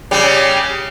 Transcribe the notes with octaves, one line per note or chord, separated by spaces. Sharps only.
C#3 G3